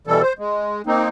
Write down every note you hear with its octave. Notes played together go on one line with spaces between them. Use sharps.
B2 E3 G3 A4
C5
G#3
A#3 C4 D#4